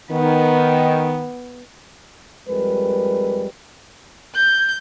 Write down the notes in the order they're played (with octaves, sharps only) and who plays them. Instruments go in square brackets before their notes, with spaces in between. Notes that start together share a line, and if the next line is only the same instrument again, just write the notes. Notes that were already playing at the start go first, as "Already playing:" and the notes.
[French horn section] D#3 [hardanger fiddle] B3
[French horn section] F2 G3 G#3 A#4 B4
[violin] G6